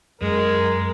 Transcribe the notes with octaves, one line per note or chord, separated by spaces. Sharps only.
F#2 G#3 A#4